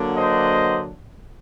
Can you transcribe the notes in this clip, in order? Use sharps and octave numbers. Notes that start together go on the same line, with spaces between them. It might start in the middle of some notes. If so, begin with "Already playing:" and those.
Already playing: D3 F#3 A#3 D4
C5 D#5